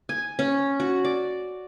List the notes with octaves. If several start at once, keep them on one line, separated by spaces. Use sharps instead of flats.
G#5
C#4
F#4
D5